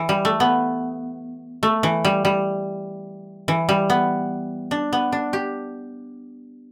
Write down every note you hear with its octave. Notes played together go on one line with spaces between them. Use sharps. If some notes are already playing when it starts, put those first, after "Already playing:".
Already playing: E3
G3
A3
B3
A3
E3
G3
G3
E3
G3
B3
D4
B3
D4
G4